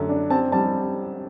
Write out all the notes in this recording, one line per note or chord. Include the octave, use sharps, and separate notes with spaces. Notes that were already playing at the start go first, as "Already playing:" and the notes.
Already playing: F#2 D3 A3
D4
C4 A5
G3 A5